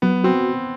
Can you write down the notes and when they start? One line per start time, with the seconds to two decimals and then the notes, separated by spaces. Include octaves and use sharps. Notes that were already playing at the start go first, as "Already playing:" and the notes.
0.02 F#3 B3
0.24 C4 F#4